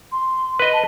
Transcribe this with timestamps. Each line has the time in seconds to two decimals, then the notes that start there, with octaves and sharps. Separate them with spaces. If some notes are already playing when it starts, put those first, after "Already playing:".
0.12 C6
0.59 B4 D#5
0.73 A5